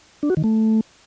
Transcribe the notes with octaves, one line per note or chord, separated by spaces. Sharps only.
D4
F#4
D#3
A3